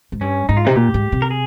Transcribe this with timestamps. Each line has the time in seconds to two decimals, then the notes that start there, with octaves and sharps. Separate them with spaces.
0.12 G#2
0.21 G2 C#4
0.49 G#2 D#4
0.57 F4
0.65 C3 D#4
0.76 A#2 G4
0.94 G#2
1.12 C3
1.22 A#4
1.31 G#4